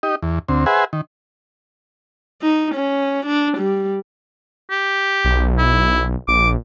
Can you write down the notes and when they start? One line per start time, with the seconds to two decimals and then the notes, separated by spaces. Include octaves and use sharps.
0.03 D#4 G4 D#5
0.23 E2
0.48 D2 C4
0.66 G#4 B4 C5 E5 F#5 G#5
0.93 D#3
2.42 D#4
2.75 C#4
3.26 D4
3.58 G3
4.71 G4
5.25 B1
5.58 E4
6.28 A#1 D6